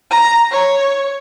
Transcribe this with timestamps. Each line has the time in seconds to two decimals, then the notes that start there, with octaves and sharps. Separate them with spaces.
0.11 A#5
0.51 C#5